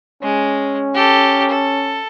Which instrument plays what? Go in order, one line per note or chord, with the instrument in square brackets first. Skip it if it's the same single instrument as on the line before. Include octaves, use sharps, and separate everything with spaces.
[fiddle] G#3 [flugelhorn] C#4
[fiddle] G4 A4
A4